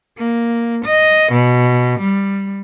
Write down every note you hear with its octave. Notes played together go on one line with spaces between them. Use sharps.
A#3
D#5
B2
G3